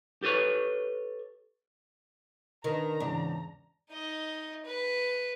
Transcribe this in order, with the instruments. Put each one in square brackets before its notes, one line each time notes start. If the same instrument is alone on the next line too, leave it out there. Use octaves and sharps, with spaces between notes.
[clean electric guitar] G4 A4 B4 C#5
[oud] D#3 [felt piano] D4 B4 [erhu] A#5
[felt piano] E2 G#2 C#3 [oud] D4
[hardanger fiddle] D#4 D#5
B4